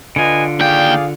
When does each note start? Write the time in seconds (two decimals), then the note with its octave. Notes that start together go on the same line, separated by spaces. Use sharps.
0.16 D3 F4 B4 D#5 G#5
0.60 D#2 G#4 D5 F5 G5